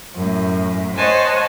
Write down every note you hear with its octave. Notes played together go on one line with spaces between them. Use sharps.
F#2 A2
C5 C#5 D#5 F#5 G#5 A5